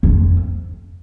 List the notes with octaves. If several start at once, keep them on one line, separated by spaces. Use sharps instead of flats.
F2